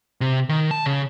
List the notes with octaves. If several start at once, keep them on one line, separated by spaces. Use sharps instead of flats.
C3
D#3
A5
C#3